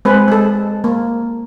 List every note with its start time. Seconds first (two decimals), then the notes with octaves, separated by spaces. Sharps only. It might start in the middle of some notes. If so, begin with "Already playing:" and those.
0.05 G#3 C4 G#4 B4
0.28 G#3 A4
0.84 A#3